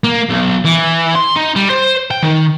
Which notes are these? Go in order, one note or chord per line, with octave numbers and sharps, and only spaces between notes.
A#3
B1
E3
C6
D#4
G3
C5
G5
D#3